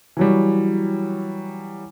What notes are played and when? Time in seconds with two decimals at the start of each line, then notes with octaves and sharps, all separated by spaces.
0.17 E3 F#3 G3